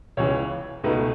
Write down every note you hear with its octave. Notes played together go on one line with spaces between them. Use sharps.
C#2 C#3 E3 C#5
C#2 B2 A3 D#4 B4